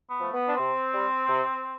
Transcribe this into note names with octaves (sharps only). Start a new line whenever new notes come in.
B3
F3 A3
B3
D4
C3 C4
G3
C3